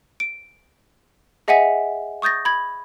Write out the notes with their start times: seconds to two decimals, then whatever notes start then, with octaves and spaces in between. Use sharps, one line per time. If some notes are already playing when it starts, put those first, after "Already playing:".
0.20 D7
1.48 G#4 D#5 E5 F#5 G#5 B6
2.22 C#6 D#6 G6 A6 A#6
2.45 B5 G#6